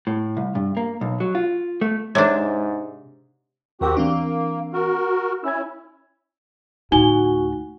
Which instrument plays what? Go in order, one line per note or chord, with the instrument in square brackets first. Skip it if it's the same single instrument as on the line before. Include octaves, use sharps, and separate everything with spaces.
[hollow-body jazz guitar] A2
C2
G2
A#3
B1
F#3
F4
A3
[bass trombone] G#2 [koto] C3 D4 [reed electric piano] G#3 [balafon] C#5
[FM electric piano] D#2 A#4 G5 [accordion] C4 F#4 G4
[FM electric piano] E3 C4 D4 [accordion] A#3
[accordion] F#4 A#4
[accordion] C#4 E4 [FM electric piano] E6 G#6
[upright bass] D2 A2 [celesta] D#4 G#5 G7 [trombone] F#4